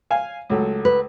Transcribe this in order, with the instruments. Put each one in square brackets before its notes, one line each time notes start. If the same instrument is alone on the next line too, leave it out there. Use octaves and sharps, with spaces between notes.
[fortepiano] F5 G#5
C#2 F#3 A3
[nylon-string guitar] B4